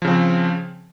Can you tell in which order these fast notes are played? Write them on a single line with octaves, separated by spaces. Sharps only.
F3 C#3 C4